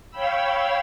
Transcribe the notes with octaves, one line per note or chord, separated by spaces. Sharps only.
C#5 F5 G5 B5 E6